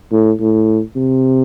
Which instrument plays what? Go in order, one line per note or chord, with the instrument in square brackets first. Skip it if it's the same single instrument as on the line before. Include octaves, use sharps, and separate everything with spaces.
[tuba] A2
A2
C3